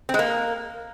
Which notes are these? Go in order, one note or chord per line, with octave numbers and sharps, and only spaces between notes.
C4
G#3
A#3